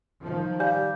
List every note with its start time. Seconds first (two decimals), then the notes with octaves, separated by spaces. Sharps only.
0.22 D#3 F3
0.60 G3 F5 G#5 G6